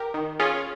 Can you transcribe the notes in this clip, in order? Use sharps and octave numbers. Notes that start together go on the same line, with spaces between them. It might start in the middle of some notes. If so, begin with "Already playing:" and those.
Already playing: G4 A#4
D#3
C#4 F4 G#4